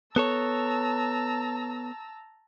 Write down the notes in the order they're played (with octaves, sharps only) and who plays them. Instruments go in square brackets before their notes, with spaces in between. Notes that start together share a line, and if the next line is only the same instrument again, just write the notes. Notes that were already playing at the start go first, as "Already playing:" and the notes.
[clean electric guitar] B3 A4 C#5 [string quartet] A5 A#5 E6